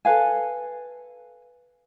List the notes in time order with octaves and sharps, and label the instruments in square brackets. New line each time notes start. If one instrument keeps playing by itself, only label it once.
[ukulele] A4 B4 F5 G#5